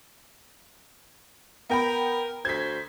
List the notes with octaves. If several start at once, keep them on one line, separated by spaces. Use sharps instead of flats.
B3 A#4 G5 B5
D2 A3 C5 G#6 B6